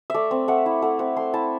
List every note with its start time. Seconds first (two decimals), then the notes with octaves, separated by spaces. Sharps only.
0.10 A3 D5 E5
0.31 C4
0.48 A3 F#5
0.66 E4
0.82 A3 F#5
0.99 C4 F#5
1.16 A3 C6
1.34 E4 A5